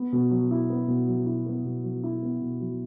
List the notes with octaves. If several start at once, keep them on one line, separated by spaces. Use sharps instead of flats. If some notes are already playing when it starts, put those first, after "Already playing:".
Already playing: B3
B2
F#3
E4
B3
B2
F#3
E4
B3
B2
F#3
E4
B3
B2
F#3